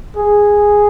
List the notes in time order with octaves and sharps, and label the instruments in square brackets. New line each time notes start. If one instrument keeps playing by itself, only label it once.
[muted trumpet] G#4